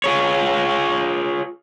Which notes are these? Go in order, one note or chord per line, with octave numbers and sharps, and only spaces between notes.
F4 G#4 C#5